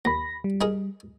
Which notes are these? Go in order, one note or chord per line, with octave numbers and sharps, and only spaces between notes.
D#2 B5 A#6
G3
D#4 G#4 A#4